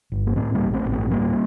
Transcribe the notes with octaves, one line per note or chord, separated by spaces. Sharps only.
G1
A#3
A2 A3 C4
G3 A#3
A1
A3 C4
A1
A3 C4
A2 G3 A#3